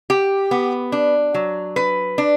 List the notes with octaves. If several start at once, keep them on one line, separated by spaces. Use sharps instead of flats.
G4
B3
D4
F#3
B4
D4